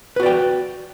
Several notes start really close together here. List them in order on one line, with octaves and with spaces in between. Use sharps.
B4 F#4 D5 G5